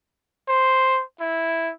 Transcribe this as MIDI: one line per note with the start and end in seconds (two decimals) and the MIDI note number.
0.49 1.02 72
1.21 1.72 64